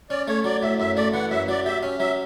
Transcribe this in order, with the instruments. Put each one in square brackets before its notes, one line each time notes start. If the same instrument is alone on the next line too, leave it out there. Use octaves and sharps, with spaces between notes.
[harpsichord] C#4 [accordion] D5
[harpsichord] A3 [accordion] C#5
[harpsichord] F#3 [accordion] D5
[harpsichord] A2 [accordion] E5
[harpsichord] F#2 [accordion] E5
[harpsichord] A3 [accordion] D5
[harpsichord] E3 [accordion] F#5
[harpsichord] F#2 [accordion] E5
[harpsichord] F#3 [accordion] D5
[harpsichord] G4 [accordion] E5
[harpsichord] C#4
[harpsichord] F#3 [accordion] E5